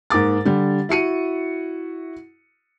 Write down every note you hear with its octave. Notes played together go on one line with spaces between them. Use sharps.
G#2 A#3 D6 A6
D3 G3
E4 F#4 C#7 D#7